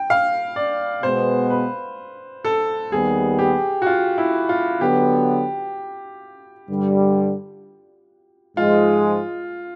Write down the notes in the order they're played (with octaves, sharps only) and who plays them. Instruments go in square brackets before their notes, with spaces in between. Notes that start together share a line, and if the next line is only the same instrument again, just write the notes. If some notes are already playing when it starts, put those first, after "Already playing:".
Already playing: [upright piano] G5
F5
D5
[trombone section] B2 G#3 B3 [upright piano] C5
[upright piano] B4
A4
[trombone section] D#2 D#3 G3 B3 [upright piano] G#4
[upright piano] G4
F#4
F4
E4
F4
[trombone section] D3 F#3 B3 [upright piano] G4
[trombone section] G2 D3 G3
[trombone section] G#2 F3 G#3 [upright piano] F4